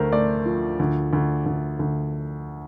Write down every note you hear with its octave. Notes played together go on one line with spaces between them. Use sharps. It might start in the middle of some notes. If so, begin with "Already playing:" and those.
Already playing: D2 A3 A#4 C5
A3 D5
F3
D2
D2
D2
D2